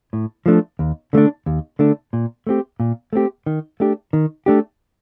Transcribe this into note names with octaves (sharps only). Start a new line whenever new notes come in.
A2
F3 A3 D4
D#2
D3 A3 D4
D#2
D3 A3 D4
A#2
A3 C4 G4
A#2
A3 C4 G4
D#3
A3 D4 G4
D#3
A3 D4 G4